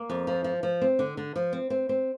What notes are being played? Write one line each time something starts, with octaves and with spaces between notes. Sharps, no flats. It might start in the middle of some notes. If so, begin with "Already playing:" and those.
Already playing: A#3
F2
F3
F3
F3
C4
D3
D3
F3
C4
C4
C4